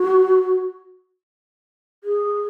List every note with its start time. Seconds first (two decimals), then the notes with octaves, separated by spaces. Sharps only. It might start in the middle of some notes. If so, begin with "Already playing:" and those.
Already playing: F#4
2.04 G#4